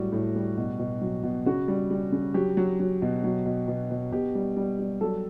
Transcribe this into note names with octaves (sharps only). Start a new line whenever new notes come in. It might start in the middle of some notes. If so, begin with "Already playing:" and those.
Already playing: A2 F#3 G3 F#4
A2
G3
B2
B2
F#3
B2
C#3 F#4
G3
G3
C#3
F#3 G4
F#3
F#3
B2
F#3
B2
B2
B2
B2 G4
G3
G3
G3
F#3 A4